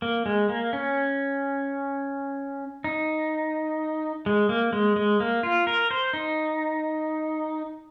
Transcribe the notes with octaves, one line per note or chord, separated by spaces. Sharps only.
A#3
G#3
A#3
C#4
D#4
G#3
A#3
G#3
G#3
A#3
F4
A#4
C5
D#4